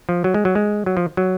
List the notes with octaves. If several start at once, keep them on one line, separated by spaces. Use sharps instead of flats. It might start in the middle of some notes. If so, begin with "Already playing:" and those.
F3
F#3
G#3
F#3
G#3
F#3
F3
F#3